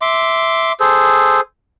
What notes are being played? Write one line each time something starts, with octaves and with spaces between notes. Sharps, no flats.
E5 C6 D6
G#4 A4 C5